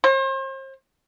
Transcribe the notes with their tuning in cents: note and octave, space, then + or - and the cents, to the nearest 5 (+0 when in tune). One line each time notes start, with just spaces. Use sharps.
C5 +40